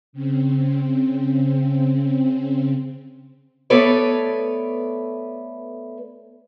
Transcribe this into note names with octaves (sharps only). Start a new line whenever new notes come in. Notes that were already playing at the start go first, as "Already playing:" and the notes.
C#3 C4
A3 B3 A4 B4 C#5 D5